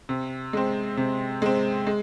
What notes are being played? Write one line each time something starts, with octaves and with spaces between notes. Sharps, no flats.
C3
G#3 C4
C3
G#3 C4
G#3